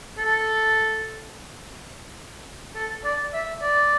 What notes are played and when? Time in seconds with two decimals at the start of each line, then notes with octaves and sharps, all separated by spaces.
0.18 A4
2.75 A4
3.04 D5
3.33 E5
3.62 D5